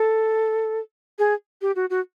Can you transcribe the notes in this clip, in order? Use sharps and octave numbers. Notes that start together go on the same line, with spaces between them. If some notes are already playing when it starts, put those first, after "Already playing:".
Already playing: A4
G#4
G4
F#4
F#4